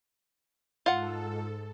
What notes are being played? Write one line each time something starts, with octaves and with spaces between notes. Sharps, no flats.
G#2 F4 A4 F#5